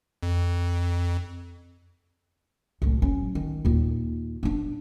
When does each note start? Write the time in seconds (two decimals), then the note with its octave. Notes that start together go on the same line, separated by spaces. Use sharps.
0.23 F2
2.82 C2 A2
3.02 F#3 C#4
3.35 D#3
3.65 D#2 A#2
4.43 B3 D4